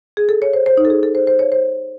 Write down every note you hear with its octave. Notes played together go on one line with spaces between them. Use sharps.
G#4
A4
C#5
C5
C5
D#4
A4
G#4
A4
C5
C5
C#5
C5